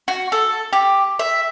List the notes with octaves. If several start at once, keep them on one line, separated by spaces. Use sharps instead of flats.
F#4
A4
G4
E5